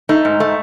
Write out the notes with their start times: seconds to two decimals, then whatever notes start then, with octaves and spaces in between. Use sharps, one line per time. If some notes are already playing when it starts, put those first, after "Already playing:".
0.09 A3 D#4
0.25 G#2
0.40 A3